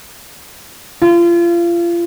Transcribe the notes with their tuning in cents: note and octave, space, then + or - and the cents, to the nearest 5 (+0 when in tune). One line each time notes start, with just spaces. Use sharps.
F4 -30